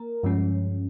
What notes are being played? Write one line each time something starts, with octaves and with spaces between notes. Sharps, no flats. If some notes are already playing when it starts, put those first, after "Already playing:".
Already playing: A#3 A#4
G2 F3 G#3 C#4